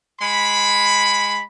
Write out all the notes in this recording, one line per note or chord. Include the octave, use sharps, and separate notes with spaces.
G#3 B5